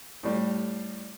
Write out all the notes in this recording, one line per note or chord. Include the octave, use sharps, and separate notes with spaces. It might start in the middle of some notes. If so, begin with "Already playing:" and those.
A2 G3